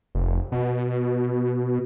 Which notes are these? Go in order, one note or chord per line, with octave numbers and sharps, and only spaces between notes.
F1
B2